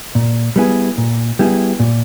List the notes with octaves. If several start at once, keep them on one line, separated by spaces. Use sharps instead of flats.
A#2
G3 B3 E4 G#4
A#2
G3 B3 E4 G#4
A#2